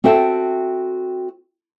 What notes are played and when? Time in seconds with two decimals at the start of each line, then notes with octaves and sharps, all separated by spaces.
0.04 C4 F#4 A4 E5 G5 A5